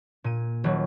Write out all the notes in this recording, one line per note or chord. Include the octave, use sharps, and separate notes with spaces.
A#2 D#7
D#1 F#3